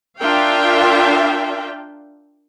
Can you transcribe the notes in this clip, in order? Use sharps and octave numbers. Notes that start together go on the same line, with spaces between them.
D4 F4 A#4 E5 F5 G5